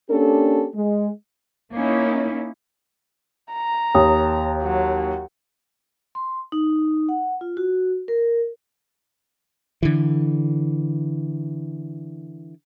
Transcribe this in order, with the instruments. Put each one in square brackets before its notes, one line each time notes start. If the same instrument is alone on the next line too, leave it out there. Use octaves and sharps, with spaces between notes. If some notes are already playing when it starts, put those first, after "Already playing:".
[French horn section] A#3 C#4 D4 G4 A4
G#3
[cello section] A#3 C#4 D#4 E4
[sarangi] A#5
[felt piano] D#2 [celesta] C#5 G5 D#6
[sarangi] F#3
[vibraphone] C6
D#4
F#5
F4
F#4
A#4
[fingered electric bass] D3 E3